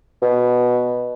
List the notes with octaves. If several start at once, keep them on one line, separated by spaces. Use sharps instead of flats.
B2